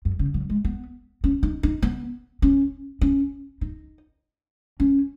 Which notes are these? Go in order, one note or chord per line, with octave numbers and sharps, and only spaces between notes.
F#2
C#3
F#3
G#3
B3
C#4
D#4
D#4
B3
C#4
C#4
D#4
C#4